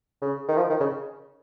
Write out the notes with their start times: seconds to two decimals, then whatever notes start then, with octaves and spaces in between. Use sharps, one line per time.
0.22 C#3
0.48 D#3
0.57 F3
0.69 D#3
0.80 C#3